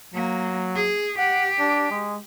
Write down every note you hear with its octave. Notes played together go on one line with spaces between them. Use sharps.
F#3 A#3
G#4
G4 F#5
D4
G#3